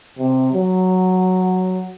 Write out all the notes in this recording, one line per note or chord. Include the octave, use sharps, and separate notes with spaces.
C3
F#3